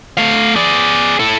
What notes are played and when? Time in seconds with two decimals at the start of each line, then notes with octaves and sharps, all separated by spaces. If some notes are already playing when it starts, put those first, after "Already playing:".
0.17 A3 F5
0.56 G#4 D5
1.19 E4 A4